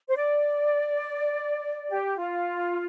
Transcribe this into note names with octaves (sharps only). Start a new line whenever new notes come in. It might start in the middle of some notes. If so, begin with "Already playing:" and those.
C5
D5
G4
F4